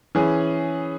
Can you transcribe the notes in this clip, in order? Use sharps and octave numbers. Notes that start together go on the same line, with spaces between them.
E3 C#4 G#4